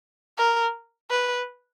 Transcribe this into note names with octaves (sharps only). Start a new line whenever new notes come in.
A#4
B4